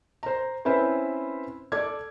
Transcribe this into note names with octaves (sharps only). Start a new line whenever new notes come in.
C5 A#5
C4 C#4 E4 B4 C5
A4 D5 D6 G#6